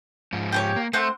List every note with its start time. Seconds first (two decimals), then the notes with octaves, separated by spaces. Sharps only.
0.33 G#2 F3
0.52 G4 C5 C#5
0.76 A#3
0.93 A3 C4 C5 F#5